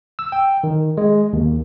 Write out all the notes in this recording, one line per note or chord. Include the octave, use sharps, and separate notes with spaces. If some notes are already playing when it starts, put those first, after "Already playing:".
E6
G5
D#3
G#3
D#2